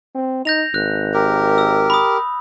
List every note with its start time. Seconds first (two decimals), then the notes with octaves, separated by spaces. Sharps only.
0.15 C4
0.45 D#4 G6 A#6 F7
0.74 G#1 F#6
1.14 G4 A#4
1.58 E6
1.90 B5 D#6